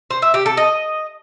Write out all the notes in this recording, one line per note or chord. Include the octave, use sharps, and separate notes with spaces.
C5
E5
G4
A4
D#5